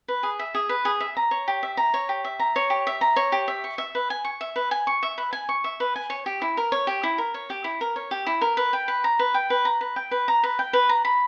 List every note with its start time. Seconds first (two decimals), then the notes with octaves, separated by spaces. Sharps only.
0.08 B4
0.23 G#4
0.39 E5
0.55 G#4
0.69 B4
0.85 G#4
1.00 E5
1.17 A#5
1.31 C#5
1.48 G4
1.63 E5
1.77 A#5
1.94 C#5
2.09 G4
2.25 E5
2.40 A#5
2.56 C#5
2.70 G4
2.87 E5
3.01 A#5
3.16 C#5
3.32 G4
3.48 E5
3.64 C#6
3.78 E5
3.95 B4
4.10 G#5
4.25 C#6
4.41 E5
4.56 B4
4.71 G#5
4.87 C#6
5.03 E5
5.18 B4
5.33 G#5
5.49 C#6
5.64 E5
5.80 B4
5.96 G#5
6.10 C#5
6.26 G4
6.42 E4
6.57 A#4
6.72 C#5
6.87 G4
7.03 E4
7.18 A#4
7.34 C#5
7.50 G4
7.64 E4
7.81 A#4
7.96 C#5
8.11 G4
8.27 E4
8.41 A#4
8.57 B4
8.73 G5
8.88 B4
9.04 A#5
9.19 B4
9.34 G5
9.50 B4
9.65 A#5
9.81 B4
9.96 G5
10.11 B4
10.28 A#5
10.43 B4
10.59 G5
10.73 B4
10.89 A#5
11.05 B5